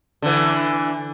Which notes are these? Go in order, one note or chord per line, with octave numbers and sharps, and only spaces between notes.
D3 E3